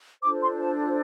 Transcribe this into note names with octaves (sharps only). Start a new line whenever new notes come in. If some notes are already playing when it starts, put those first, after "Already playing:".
D4 F4 A4 C5 D6
C6
A5